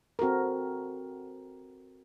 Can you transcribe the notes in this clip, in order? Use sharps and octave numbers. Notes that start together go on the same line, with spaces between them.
C4 F#4 A4 A#4